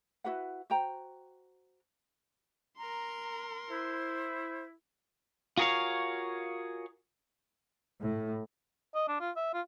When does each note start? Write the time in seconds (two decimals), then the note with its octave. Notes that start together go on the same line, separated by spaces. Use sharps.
0.24 E4 F#4 B4 F#5
0.70 F#4 C5 G5 A#5
2.78 A#4 A#5 C6
3.69 E4 C5
5.57 F4 F#4 G#4 A#4 C#5 F5
8.00 A2
8.95 D#5
9.08 D4
9.20 F4
9.36 E5
9.54 F4